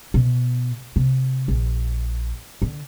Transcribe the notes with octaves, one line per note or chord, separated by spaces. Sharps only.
B2
C3
A#1
D3